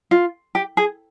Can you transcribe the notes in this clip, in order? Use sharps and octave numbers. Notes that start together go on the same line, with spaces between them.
F4
G4
G#4